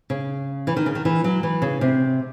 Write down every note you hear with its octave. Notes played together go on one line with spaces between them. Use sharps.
C#3
E3
D#3
C#3
D#3
E3
F#3
E3
C#3
C3